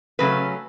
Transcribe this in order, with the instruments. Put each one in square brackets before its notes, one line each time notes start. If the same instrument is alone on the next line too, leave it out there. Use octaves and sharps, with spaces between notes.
[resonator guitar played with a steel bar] C#3 F#3 A3 C#4 B4